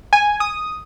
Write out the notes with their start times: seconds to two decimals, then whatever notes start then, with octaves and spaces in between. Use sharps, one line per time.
0.13 G#5
0.40 D#6